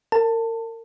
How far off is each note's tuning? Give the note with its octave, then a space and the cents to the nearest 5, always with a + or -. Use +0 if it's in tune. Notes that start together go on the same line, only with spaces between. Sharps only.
A#4 -35 A5 +20